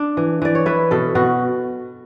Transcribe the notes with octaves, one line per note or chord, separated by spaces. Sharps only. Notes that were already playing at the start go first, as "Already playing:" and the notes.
Already playing: D4
E3
E3 D5
C#5
E4 B4
B2 A4
B2 F#4